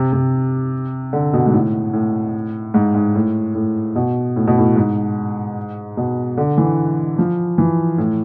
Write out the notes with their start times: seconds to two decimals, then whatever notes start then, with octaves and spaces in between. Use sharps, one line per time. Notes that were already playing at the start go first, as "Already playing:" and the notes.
Already playing: C3
0.13 C3
1.13 D3
1.33 B2
1.46 G#2
1.53 A2
1.93 A2
2.74 G#2
2.94 G#2
3.15 A2
3.55 A2
3.96 B2
4.36 A2
4.47 B2
4.58 A2
4.76 G#2
5.97 B2
6.37 D3
6.57 E3
7.18 F3
7.58 E3
7.98 A2